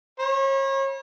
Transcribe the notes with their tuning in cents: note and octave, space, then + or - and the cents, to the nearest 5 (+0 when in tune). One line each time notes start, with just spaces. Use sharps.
C#5 -35 B5 -40